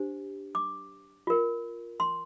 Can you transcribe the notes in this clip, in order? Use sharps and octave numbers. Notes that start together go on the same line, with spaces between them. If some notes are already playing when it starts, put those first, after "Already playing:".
Already playing: D4 G4 C5
D6
F4 A#4
C6